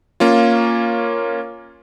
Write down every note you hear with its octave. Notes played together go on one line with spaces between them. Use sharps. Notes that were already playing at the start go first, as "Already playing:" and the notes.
A#3 C#4 F4